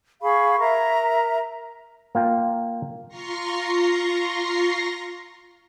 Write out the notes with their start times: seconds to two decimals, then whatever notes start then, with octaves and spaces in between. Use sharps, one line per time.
0.22 G#4 F5 B5 C#6
0.60 A#4 E5 A#5
2.15 A#3 F4 G5
3.08 F4 A#5 C6 C#6 A#6 C7